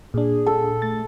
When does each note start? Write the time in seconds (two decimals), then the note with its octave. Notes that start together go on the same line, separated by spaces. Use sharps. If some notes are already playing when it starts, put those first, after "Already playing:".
0.14 A#2 D4 G#4
0.46 A4
0.82 A3 A6